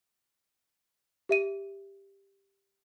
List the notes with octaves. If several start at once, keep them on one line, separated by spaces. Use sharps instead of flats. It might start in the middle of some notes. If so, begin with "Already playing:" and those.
G4 E5 D#7